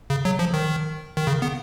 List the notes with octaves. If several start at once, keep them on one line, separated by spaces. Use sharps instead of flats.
C#3
F#3
F3
D#3
D#3
C#3
B3